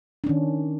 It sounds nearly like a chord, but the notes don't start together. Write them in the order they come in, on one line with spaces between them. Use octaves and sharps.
D4 C#4 D#3